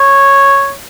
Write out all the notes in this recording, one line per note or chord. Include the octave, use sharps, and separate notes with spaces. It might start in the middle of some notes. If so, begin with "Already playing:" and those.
Already playing: C#5